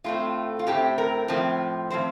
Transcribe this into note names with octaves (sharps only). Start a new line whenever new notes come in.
A2 A3 C4 F4
F4
A2 A3 C4 G4
A#4
A2 F3 C4
A2 F3 C4 C5